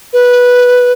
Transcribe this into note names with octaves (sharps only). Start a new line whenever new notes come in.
B4